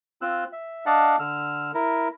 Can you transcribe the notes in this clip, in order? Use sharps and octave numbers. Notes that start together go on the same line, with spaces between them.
C4 F4 E6 F#6
E5
D4 D5 D#5 F5 F#5 A5
D3 E6 F6
E4 A#4